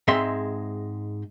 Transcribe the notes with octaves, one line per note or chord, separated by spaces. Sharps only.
G#2 G#3 C4 D#5 E5 C6